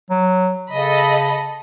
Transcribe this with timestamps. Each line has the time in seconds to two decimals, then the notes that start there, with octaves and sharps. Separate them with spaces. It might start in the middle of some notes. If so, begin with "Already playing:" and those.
0.10 F#3
0.71 C#3 A4 D#5 B5